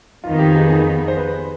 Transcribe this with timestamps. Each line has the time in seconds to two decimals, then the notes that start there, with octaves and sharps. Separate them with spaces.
0.23 F2 D#3 B3 D#4 F4
0.39 G4
0.55 G#4
0.70 G#4
1.08 C5
1.18 B4